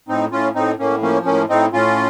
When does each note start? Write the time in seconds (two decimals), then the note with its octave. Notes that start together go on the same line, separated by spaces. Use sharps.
0.08 A2 C4 D#4
0.32 A2 C#4 F4
0.55 A2 C4 D#4
0.79 A2 A#3 C#4
1.02 F3 A#3 C#4
1.25 A2 A#3 C#4
1.49 A2 C4 D#4
1.72 A2 C#4 F4